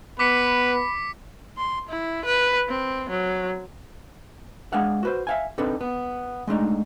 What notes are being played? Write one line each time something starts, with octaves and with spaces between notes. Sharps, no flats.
B3 B4 B5 D6 B6 C#7
C6
E4
B4
C4
F#3
G#3 D4 F5 F#5
F#4 B4 C5
E5 F5 G#5
C4 D4 D#4 A4 B4
B3
G#3 A3 D4 D#4